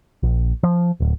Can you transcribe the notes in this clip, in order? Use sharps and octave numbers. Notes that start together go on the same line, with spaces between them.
A#1
F3
D1